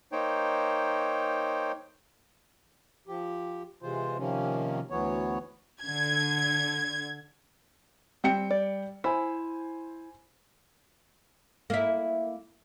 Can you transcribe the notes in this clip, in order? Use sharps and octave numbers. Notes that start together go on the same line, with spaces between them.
A#3 D#4 C5 C#5 G5
F3 G4
C3 E3 G#3 F4 C5
C3 D#3 F3 A#3 C#4
D2 E3 F#3 B3 C#5
D3 G#6
G3 C4 G5 C#7
D5
E4 C5 G#5
A#3 E4